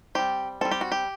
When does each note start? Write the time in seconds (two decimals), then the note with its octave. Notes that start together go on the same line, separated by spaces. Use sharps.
0.15 G3 C4 G4
0.61 G3 C4 A4
0.71 G4
0.81 F#4
0.92 G4